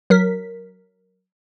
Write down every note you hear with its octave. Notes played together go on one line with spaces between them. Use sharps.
F#3 A#4 B6